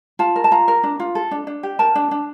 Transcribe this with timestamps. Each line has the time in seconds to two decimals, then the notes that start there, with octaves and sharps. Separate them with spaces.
0.19 F4 A5
0.36 A#4
0.44 A5
0.51 F4 A#5
0.68 A#4
0.84 D4
1.00 F4
1.15 A4
1.31 D4
1.47 D4
1.63 G4
1.79 A#4 A5
1.95 D4
2.11 D4